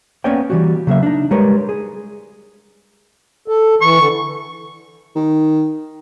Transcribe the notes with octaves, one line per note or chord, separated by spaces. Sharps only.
A#3 B3 C#4 C#5 D5 G5
E3 G3 F#4
C#3 F#3 A#3 E5
D4 D#4
G3 G#3 A#4 B4 C#5
G#4
A4
E3 C#6
D3
D#3